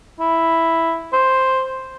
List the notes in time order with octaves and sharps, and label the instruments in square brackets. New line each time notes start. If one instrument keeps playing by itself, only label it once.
[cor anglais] E4
C5